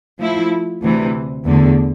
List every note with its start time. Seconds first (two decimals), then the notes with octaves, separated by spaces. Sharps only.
0.19 F3 A3 E4
0.82 D2 C3 E3
1.45 E2 D3 A3